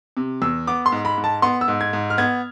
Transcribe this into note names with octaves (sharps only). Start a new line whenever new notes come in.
C3
E2 E6
B3 D6
C6
G#2
B5
G#2
A5
B3 C6
E6
G#2
G#6
G#2
F6
B3 G#6